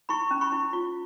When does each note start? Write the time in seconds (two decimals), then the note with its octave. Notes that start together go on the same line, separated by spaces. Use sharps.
0.09 E4 B5 C#6
0.31 C#4
0.41 B5 C#6
0.52 E4
0.73 F4